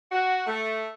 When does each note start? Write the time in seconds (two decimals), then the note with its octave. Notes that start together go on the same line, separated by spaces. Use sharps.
0.12 F#4
0.47 A3